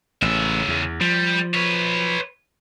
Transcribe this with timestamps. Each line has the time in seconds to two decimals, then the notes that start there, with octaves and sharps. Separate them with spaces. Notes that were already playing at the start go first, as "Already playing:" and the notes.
0.22 A1 C#3 E5
0.68 E2
1.01 F3 G3
1.54 B4 C#5